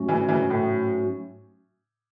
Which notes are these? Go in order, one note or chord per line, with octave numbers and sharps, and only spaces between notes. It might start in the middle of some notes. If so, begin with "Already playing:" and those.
Already playing: G#2 F#3 A3 C#4 F#4
C#3 E3
C#3 E3
A2